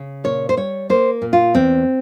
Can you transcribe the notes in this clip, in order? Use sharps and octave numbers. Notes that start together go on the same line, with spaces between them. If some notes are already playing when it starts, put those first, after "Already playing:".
Already playing: C#3
A#2 C#5
C5
G3 C#5
A#3 C5
A#2
F4
E2 C4